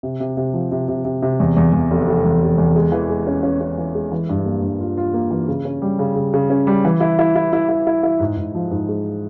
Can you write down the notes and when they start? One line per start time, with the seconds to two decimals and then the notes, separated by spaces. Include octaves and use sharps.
0.03 C3
0.20 C3
0.37 C3
0.54 F3
0.72 C3
0.88 C3
1.05 C3
1.22 C3
1.40 E2
1.57 E2
1.73 E2
1.91 F1
2.07 F1
2.25 E2
2.42 F1
2.58 E2
2.76 G#3
2.92 E3
3.10 G#3
3.27 C#4
3.43 C#4
3.61 C#4
3.78 E3
3.95 G#3
4.12 E3
4.29 G2
4.46 A#3
4.62 G2
4.80 F4
4.97 F4
5.14 A#3
5.31 E3
5.48 C#3
5.65 C#4
5.82 G3
5.99 C#3
6.16 C#3
6.34 C#3
6.50 C#4
6.67 G3
6.85 E3
7.00 E4
7.19 E4
7.36 E4
7.53 E4
7.69 E4
7.87 E4
8.03 E4
8.20 G#2
8.37 G#2
8.55 F3
8.71 G#2
8.88 G#3